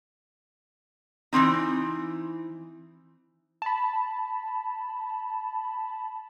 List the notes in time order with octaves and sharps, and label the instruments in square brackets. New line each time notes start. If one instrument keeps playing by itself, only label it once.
[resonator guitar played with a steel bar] E3 A#3 C4 D#4
[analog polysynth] A5 B5